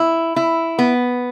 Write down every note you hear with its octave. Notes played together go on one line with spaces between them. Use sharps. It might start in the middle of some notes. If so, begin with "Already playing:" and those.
Already playing: E4
E4
B3